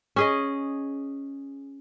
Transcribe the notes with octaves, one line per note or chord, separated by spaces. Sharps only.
C#4 G#4 D#5